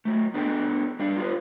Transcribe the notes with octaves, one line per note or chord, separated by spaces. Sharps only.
F#3 A3
B3 D4 G#4 A4 D5 G5
G3 D4 G4 D5 F5
F4 G4 B4